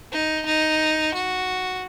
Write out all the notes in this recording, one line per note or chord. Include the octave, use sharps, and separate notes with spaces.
D#4
D#4
F#4